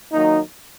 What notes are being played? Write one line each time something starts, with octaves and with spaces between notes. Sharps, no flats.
D#3 F#3 A#3 D#4